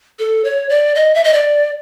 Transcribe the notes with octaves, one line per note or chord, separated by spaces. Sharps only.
A4
C#5
D5
D#5
E5
D#5
D5